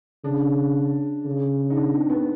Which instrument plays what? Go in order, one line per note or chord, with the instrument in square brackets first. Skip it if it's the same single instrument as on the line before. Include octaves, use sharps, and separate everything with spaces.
[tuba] C#3 [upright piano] D4
[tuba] C#3
[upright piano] D#4
D4
C4
B3